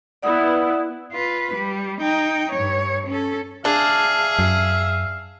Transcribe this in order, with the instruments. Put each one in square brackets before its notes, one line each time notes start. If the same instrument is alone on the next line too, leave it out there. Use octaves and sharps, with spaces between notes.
[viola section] B3 E4 [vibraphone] D5 F#5 D#6
[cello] F4 B4
G3
D#4 G5
G2 C#5
C#4 A4
[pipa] D4 [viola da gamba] G#4 [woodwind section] E5 F5
[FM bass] F#2